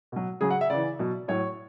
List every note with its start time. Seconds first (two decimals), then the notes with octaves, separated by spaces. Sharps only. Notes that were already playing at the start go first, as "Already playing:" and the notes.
0.12 B2 F#3
0.40 C#3 F#3 G#4
0.50 F#5
0.61 E5
0.70 C#3 E3 D5
0.99 B2 F#3
1.28 A2 F#3 C#5